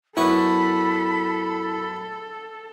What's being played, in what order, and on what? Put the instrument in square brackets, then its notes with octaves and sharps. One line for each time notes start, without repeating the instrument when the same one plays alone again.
[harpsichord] F#2 B3 C#6 [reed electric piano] E4 [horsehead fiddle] A4 [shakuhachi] B5